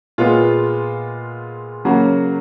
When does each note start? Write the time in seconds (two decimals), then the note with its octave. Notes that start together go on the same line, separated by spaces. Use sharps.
0.18 A#2 G#3 B3 F4
1.85 C#3 F#3 A#3 F#4